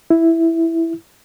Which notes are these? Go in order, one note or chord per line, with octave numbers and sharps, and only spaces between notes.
E4